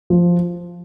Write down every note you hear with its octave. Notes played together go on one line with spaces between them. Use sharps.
F3